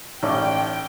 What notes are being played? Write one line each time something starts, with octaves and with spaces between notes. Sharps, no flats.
A1 D#4 C#5 D5 G5